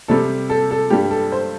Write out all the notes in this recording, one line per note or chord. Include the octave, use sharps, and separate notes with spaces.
C3 G3 A4
A4
A4
G2 G3 G4
A4
C5